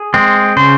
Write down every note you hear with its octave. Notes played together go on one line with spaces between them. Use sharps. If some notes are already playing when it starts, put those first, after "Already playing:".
Already playing: G#4
G#3 C4
C#3 C5